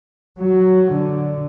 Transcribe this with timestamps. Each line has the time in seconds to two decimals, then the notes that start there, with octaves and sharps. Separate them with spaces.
0.39 F#3
0.91 D3